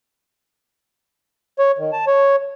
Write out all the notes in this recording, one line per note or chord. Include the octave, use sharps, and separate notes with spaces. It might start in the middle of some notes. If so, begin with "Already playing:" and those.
C#5
D#3
A5
C#5